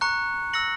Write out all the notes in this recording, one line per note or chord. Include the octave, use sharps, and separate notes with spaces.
A#5 C#6 F#6 C#7
E6 A#6 C#7 F#7